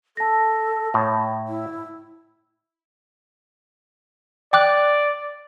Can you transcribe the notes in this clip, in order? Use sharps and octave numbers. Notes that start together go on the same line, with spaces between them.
A4 A5 A#6
A2 C#5
E4
D5 G5 D6 F#6